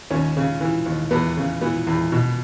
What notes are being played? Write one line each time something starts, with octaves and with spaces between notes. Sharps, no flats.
D#2 C#4
C#3
E3
D#2
E2 B3
C#3
E3 B3
E2
B2